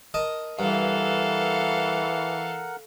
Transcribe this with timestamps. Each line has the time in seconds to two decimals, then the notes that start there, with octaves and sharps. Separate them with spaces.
0.14 A#4 D#5 A5
0.59 G2 E3 A4 A#4 F5 F#5